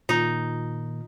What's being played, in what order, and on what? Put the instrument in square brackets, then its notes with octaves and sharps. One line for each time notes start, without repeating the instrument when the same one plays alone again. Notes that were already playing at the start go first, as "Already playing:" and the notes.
[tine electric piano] A#2 D#3 [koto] D#4 [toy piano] F4